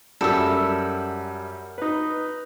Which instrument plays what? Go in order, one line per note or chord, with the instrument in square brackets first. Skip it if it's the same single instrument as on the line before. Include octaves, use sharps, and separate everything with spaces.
[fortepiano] F#2 G3 [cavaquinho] A4 E5
[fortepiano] D#4 B4